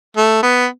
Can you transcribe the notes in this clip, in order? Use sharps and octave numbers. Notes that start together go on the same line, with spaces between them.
A3
B3